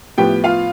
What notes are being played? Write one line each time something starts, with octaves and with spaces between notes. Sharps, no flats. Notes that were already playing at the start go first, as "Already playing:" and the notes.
A2 F3 B3 G4 G5
F4 F5